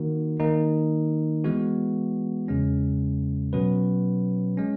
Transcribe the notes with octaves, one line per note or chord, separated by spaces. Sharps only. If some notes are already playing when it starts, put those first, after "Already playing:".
Already playing: D#3 A#3 D#4 F#4 A#4
D#3 A#3 D#4
E3 G#3 B3 F#4
E2 C#3 G#3 C#4
B2 F#3 C#4 F#4 B4
G#3 C#4